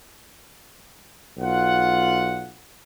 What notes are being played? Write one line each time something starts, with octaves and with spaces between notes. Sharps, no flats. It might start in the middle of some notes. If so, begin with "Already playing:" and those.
B1 F4 F#5